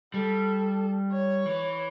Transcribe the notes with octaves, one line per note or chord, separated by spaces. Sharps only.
G3 A4
C#5
E3